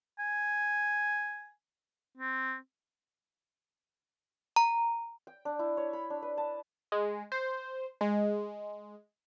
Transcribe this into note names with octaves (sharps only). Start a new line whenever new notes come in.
G#5
C4
A#5
G5
D4
E4
C#5
B5
D4
B4
A5
G#3
C5
G#3